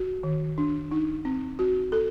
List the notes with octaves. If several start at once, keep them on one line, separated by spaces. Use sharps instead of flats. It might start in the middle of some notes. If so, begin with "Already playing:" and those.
Already playing: F#4
D#3
D4
D#4
C4
F#4
A4